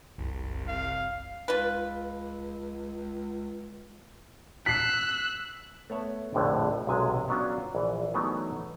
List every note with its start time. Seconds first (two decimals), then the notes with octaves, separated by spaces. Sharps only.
0.18 F#1 C2
0.67 F5
1.48 C#2 F4 B4
4.66 E6 F#6 B6 C7
5.90 A3 B3 C#5 E5
6.34 A#1 F2 A2 D3
6.87 B1 F#2 C3 G#3 G#5
7.28 F#3 B3 C#4 D4 F4 F#4
7.75 A#1 E3
8.14 E3 F#3 A3 B3 D#4 F#4